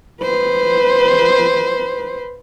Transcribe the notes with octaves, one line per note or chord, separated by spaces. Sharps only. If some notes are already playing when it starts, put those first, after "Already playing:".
B4 C5